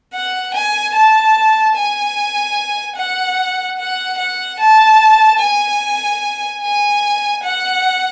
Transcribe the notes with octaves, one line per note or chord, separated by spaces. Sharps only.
F#5
G#5
A5
G#5
F#5
F#5
F#5
A5
G#5
G#5
F#5